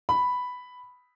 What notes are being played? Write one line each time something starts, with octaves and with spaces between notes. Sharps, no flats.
B5